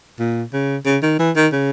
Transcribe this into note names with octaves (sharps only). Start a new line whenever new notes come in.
A#2
C#3
C#3
D#3
E3
D#3
C#3